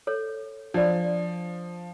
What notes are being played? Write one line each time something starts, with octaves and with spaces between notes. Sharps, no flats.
A4 C#5
F3 D4 D5